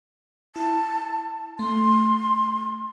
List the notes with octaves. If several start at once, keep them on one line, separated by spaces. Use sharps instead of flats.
E4 A5
A3 C6